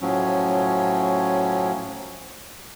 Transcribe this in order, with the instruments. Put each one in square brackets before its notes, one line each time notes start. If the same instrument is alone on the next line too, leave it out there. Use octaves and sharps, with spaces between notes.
[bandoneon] A2 F3 F#3 C#4